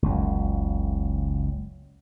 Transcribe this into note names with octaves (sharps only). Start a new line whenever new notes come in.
F#1 C#2